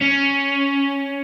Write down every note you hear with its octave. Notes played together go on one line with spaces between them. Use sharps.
C#4